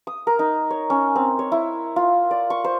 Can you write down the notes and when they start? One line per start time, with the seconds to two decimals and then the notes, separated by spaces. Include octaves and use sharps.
0.07 D#6
0.27 A#4
0.39 D#4
0.70 C#5
0.90 C#4
1.16 C4
1.39 C#5
1.52 E4
1.96 F4
2.31 D5
2.50 C#6
2.64 C5